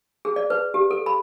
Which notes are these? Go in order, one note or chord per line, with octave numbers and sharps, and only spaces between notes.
G#4
D5
B4
G4
A4
B5